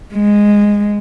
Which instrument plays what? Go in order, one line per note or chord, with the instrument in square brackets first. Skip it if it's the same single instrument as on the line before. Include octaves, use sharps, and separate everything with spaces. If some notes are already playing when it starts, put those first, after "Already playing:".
[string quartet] G#3